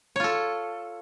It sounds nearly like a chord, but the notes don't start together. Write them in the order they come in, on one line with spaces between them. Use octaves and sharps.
C#5 F4 A4